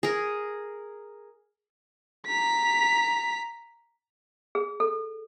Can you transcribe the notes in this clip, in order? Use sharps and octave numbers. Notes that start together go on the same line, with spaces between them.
G#4 A#4
A#5 B6
G#4
A4